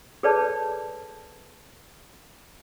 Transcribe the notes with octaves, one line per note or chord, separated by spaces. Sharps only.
G#4 A4 B4 C#5 D5 A5